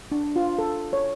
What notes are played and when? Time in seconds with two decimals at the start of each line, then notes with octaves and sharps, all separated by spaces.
0.12 D4
0.36 F4
0.58 A4
0.93 C#5